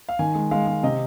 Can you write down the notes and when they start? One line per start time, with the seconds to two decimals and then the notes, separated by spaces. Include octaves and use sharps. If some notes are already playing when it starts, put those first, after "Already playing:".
0.09 F5
0.19 D#3 G#5
0.35 G#3
0.51 G#3 F5
0.67 G#3
0.83 C3 D#5